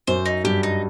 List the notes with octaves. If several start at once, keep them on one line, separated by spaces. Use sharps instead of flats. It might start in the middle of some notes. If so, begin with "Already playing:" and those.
F#2 C5
D#4
G2 G4
D#4